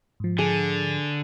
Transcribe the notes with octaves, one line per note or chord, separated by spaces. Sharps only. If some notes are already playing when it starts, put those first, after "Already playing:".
G#2 F3
D3 G#4